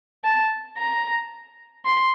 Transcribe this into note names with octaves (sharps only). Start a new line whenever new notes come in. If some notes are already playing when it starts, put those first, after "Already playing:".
A5
A#5
C6